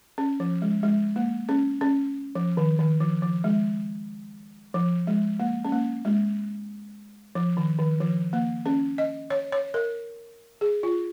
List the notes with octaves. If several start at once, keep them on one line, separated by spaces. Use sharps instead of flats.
C#4
F3
G#3
G#3
A#3
C#4
C#4
F3
D#3
D#3
F3
F3
G#3
F3
G#3
A#3
C#4
A#3
G#3
F3
D#3
D#3
F3
A#3
C#4
D#5
C#5
C#5
A#4
G#4
F4